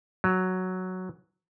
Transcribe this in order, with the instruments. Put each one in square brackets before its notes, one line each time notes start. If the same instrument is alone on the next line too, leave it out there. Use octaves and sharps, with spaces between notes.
[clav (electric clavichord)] F#3